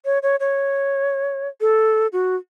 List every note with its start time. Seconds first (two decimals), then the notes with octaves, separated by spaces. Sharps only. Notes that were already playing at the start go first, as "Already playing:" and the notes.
0.05 C#5
0.23 C#5
0.40 C#5
1.61 A4
2.13 F#4